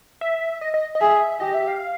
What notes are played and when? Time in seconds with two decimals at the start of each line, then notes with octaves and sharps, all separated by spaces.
0.21 E5
0.61 D#5
0.74 D#5
0.95 D#5
1.00 G#4 E5
1.40 G4 D#5
1.54 E5
1.68 F5